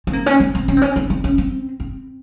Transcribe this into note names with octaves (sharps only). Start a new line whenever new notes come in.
C4
A#3
C#4
C4
C4
C#4
C4
C#4
C4
C4
C#4
C4
C4